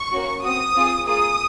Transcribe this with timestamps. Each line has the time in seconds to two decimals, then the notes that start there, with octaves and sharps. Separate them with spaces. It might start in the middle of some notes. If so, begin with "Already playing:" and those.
Already playing: C#6
0.13 A#3 C#4 F#4
0.43 C4 F#4 D#6
0.75 C4 F4 G#4
1.06 A#3 F4 G#4 D#6